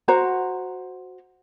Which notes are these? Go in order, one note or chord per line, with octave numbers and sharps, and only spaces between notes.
F#4 C5 A#5